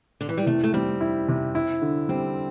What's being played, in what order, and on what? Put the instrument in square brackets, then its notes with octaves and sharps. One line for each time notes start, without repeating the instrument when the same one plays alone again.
[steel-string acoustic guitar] D3
E3
G3
[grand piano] C3 [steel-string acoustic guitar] A3
[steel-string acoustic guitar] A3
[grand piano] G3 [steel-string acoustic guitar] C4
[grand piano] E4
C3
E4
D3
[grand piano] G3 [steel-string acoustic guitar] C4